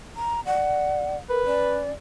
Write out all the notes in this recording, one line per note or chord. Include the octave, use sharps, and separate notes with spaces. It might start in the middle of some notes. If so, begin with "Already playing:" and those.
A#5
D5 F#5
A#4 B4
C#4 D5